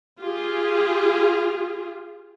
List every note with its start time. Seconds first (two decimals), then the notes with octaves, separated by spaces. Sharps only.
0.20 F4 G4 G#4